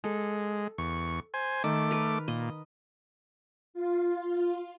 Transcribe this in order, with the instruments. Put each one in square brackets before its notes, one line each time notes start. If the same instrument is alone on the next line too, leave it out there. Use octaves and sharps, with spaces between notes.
[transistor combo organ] G#3 [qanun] A4
[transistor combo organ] E2 C#6
C5 G#5
[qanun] D#3 [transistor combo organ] A3 D6
[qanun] A#4 B4
[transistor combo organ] A#2 [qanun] D#5
[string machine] F4